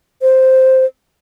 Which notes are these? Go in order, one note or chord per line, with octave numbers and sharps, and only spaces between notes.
C5